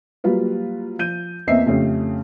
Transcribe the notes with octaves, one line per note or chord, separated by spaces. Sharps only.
F#3 G3 A#3 F4 B4
F3 G6 D#7
E2 A#3 C4 D#5 E5 C7
F2 C#3 A3 C#4 G4